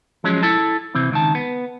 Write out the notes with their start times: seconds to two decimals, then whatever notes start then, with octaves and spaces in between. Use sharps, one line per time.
0.24 F3 F#3 G#3 C#4
0.43 E4 A4 A5
0.95 C3 E3 C4
1.11 C#2 D#3 A5
1.35 B3